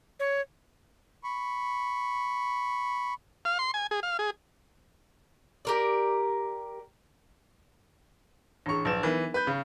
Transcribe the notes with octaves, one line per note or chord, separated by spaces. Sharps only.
C#5
B5 C#6
F5
C6
G#5
G#4
F5
G#4
G4 A#4 D5
A1 D4 G#4 C#6
A#1 F#3 B4 E7
E3 B3 D#4 A#4
B4 G6
C#3